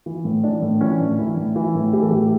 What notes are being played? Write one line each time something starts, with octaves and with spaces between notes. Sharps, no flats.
E3
A2
E3 D4
A2
E3 C#4
A2 D4
E3 E4
A2
E3
A2
E3 G4
A4
A2 G4